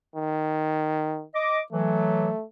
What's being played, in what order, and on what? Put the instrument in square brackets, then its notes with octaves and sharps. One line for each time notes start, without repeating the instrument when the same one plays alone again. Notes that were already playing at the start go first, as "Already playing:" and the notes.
[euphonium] D#3
[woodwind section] D#5 D6
[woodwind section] E3 F#3 [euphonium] A3